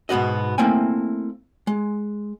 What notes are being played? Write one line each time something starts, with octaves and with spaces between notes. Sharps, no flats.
G#2 B2 B3 F#4 D#5
A3 A#3 C4 E4 G5 G#5
G#3